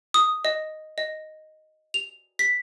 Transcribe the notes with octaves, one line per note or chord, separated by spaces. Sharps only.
D#6
D#5
D#5
F7
B6